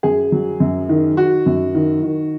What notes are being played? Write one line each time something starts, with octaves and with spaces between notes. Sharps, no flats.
F#2 G#4
F#3
F#2
D#3
D#3 F#4
F#2
D#3
D#3